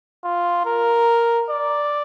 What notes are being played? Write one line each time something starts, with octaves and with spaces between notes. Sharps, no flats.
F4
A#4
D5